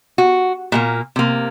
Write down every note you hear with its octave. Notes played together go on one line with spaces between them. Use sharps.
F#4
A#2 A3 A#3
C3 A#3